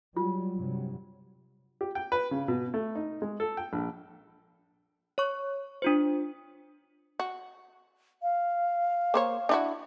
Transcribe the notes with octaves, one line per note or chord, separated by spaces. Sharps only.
F#3 G3 F4
G2 C3 F#3
G4
G5
B4
C#3
B2
A3
D#4
G#3
A4
G5
A#1
C#5 C#6
D4 F4 C5
F#4
F5
A#3 C5 C#5
D4 E4 F#4